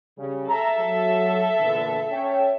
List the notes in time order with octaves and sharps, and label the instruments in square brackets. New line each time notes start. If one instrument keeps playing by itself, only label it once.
[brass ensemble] C#3 G3
[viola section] A4 E5 [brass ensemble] A#5
[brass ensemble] F#3
E2 A#2 D3
C#4 C#5 G5